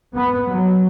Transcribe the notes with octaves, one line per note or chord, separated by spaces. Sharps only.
B3
F#3